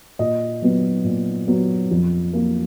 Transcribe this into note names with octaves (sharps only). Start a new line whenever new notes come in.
A#2 D#5
F#3 B3
A#2
F#3 B3
F2
F3 A#3